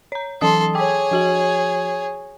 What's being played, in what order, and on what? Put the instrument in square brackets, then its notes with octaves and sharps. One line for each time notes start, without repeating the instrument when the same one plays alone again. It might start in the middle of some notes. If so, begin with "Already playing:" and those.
[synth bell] C#5 A#5
[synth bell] E3 F#3 D#6 [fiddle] A4 C6
[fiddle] G#4 C#5 [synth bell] G5 D6
[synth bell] F3 F#4 F#7